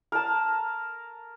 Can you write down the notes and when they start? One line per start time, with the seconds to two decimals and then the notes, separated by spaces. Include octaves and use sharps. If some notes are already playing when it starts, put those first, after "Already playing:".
0.12 A#4 A5